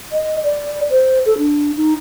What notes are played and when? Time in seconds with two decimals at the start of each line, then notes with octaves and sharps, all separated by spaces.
0.12 D#5
0.44 D5
0.91 C5
1.26 A4
1.38 D4
1.77 D#4